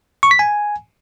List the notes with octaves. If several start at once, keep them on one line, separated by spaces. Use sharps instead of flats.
C#6
B6
G#5